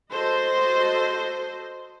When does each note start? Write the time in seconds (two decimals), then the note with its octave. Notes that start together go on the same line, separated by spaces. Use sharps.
0.13 F#4 A4 C5 D#5 C6